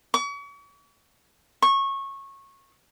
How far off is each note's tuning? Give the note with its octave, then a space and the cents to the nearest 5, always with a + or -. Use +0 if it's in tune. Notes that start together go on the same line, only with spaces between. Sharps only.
C#6 +40
C#6 -20